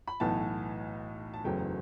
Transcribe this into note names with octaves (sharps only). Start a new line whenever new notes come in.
B5
B1 A2 E3 B3 A5
A5
F#1 E2 C#3 F#3 A3 G5